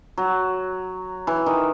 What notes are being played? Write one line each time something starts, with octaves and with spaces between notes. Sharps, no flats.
F#3
E3
D#3